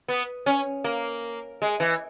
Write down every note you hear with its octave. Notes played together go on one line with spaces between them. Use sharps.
B3
C#4
A#3
G#3
E3